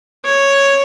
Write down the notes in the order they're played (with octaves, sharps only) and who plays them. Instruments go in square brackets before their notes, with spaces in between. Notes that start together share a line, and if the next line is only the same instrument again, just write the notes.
[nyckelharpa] C#5